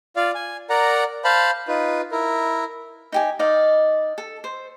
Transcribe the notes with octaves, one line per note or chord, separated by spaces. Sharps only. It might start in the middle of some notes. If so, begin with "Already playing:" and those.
F4 D5 F5
G#5
A#4 D5 F#5 A#5
C5 F5 A5 B5
D#4 F4 B4
E4 A#4
D#4 G4 G#5
D#4 D5 D#5 F5
A4
C5